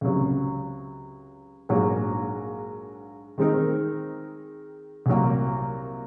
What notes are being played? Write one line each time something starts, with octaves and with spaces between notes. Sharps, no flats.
C#2 C3 F#3
A#1 G#2 F#3 A#3
D#3 G#3 C4 D#4 A#4
C2 A#2 F#3 A#3